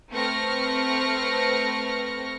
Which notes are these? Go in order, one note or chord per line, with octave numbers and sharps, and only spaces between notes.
A3 C4 B4 C#6 F6 A#6